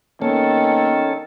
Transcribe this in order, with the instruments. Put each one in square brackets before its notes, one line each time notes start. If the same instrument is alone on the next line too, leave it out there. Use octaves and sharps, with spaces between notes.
[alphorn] D#3 [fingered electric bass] A#3 B3 [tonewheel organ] C#4 A4